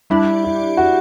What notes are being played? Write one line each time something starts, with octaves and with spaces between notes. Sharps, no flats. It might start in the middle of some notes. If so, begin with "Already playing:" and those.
G3 D4 E4 G4 D5
E4
F#4